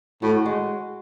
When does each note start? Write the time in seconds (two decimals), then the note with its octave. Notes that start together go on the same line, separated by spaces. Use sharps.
0.22 A2 F#4
0.46 G#3